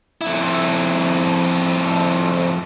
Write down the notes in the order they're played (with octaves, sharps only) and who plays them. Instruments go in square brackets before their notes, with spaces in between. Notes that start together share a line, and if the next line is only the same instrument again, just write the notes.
[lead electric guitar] F2 E4